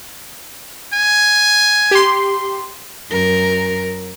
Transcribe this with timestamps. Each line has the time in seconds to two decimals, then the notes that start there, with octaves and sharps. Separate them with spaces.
0.93 G#5
1.91 G4 C6
3.11 F#2 A#4